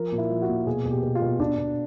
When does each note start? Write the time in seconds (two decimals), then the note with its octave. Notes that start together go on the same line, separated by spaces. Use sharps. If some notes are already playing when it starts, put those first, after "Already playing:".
Already playing: F3 A#4
0.12 A#2
0.18 E4
0.30 F3
0.42 F#4
0.48 A#2
0.67 B2 G#4
0.85 B2
0.91 G4
1.03 B2
1.15 F4
1.22 B2
1.40 B2 D4
1.58 B2